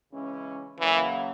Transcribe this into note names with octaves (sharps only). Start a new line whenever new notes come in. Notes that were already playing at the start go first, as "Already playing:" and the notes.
C#3 E3 G#3 C#4
C#3 E3 F#3 A#3